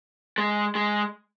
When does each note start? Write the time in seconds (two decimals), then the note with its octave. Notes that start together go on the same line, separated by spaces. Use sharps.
0.38 G#3
0.75 G#3